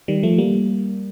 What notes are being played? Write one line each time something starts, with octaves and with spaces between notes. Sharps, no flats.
D#3 G3
F3 A3
G3 A#3